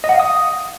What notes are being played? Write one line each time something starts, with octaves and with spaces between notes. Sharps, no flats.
D#5
F#5
F5
D#6